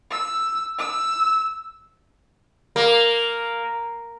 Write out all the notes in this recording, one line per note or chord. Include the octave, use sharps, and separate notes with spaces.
E6
E6
A#3